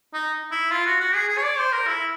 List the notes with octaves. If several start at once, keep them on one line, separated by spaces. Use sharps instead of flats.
D#4
E4
F4
F#4
F#4
G#4
G#4
C#5
D5
C5
A#4
E4